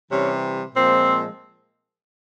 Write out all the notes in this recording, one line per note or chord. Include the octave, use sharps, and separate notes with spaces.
C3 E3 G3 C#4
A#2 F3 G#3 C4